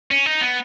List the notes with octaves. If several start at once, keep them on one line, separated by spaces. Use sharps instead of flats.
C#4
D#4
B3